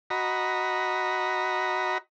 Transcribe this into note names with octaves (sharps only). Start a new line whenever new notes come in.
F#4 D#5 A#5 B5